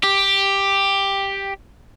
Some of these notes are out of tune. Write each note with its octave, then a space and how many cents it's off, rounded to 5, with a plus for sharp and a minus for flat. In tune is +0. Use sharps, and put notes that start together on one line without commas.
G4 +5